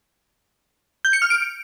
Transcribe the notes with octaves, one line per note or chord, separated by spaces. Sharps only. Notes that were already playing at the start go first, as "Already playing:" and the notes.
G6
C#7
F6
D7